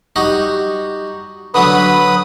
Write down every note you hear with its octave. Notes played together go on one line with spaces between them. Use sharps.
G3 D#4 F#4
D3 F#3 B3 B4 B5 D#6